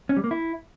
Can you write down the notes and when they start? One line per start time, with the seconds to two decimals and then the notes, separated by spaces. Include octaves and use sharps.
0.09 C#4
0.17 G3
0.24 A#3
0.31 E4